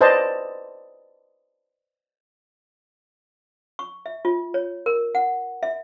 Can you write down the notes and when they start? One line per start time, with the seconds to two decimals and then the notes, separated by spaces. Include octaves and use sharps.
0.01 B4 C5 D5 D#5 A5
3.79 C#6
4.06 E5
4.25 F4
4.54 C#5
4.86 A#4
5.15 F#5
5.63 E5